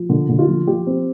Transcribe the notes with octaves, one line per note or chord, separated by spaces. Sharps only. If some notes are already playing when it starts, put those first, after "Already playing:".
Already playing: F3
D3
D3
F4
F3
F3 G4
C4